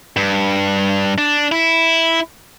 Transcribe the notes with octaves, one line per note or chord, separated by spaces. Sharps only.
G2
D4
E4